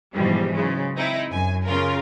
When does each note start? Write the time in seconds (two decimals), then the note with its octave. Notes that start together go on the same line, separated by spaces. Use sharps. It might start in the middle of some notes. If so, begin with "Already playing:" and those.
0.13 G#2 B2 E3 F3 G3
0.55 C#3 F#3 G#3
0.95 C4 D#4 E4
1.30 F#2 G#5
1.66 C#3 F4 A#4